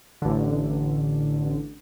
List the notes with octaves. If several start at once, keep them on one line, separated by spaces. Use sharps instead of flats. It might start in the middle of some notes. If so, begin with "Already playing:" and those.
A1 D3